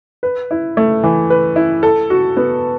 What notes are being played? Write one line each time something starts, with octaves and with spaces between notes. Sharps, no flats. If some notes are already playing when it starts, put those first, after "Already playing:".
B4
E4
A3
E3
B4
E4
A4
F#4
B3